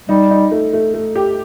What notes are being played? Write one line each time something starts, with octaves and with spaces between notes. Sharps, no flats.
G3 D#4
D#4
A3
A3
A3
G4